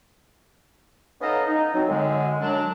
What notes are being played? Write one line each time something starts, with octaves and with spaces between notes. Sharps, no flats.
B3 C#4 D#4 A4 D#5 F5
D#4
F#3 C4
F#2 D3 G#3
F#2 F#3 D4